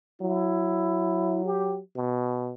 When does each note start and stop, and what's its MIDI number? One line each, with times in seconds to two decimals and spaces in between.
0.22 1.80 54
0.22 1.43 64
1.45 1.78 67
1.95 2.54 47